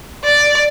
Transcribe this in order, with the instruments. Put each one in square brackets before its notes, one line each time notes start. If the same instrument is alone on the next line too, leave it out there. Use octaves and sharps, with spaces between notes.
[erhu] D5